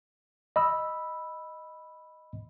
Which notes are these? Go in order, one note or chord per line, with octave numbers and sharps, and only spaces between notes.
D#5 B5 E6